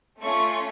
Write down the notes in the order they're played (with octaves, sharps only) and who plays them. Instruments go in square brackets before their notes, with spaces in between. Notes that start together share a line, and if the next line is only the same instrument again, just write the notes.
[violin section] A3 C#4 F4 C#6